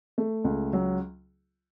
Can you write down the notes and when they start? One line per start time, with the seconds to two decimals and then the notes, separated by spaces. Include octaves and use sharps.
0.18 A3
0.44 C#2
0.73 F#3